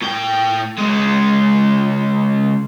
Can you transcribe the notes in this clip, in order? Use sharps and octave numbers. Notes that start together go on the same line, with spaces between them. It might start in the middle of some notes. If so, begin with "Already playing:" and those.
A2 G5
C#2 G#3